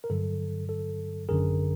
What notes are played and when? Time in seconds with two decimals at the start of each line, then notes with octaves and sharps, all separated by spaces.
0.04 A#4
0.10 G2 D3 F#3 A4
0.69 A4
1.29 G#1 F#2 D3 G#4 A#4